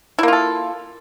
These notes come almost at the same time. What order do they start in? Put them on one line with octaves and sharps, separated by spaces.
E4 A#3 F4 A4